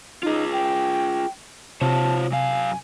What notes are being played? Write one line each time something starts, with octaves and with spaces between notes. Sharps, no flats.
D#4 F4 G#4
G5
C3 F4 C5 C#5 A5
F#2 F5 G#5